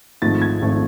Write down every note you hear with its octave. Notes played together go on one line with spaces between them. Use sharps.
G#1 G#2 F3 A3 C4 A6
G#6
G#1 G#2 F3 A3 C4